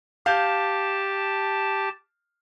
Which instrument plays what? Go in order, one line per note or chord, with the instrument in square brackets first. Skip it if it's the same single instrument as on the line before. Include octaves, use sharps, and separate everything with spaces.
[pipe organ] G4 A5 [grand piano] F5 G6